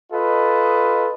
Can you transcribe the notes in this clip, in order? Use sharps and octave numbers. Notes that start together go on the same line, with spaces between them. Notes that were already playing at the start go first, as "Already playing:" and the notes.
F4 A4 B4 D#5